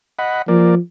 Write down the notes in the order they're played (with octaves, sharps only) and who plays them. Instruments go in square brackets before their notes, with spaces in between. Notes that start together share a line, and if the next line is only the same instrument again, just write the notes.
[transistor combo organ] D#5 F#5 B5
[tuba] F3 [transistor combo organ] A#3 A#4 D5